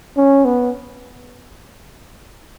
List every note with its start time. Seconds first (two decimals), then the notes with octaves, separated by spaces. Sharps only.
0.17 C#4
0.45 B3